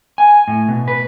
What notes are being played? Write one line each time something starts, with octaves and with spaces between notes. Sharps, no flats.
G#5
A2
B2
B4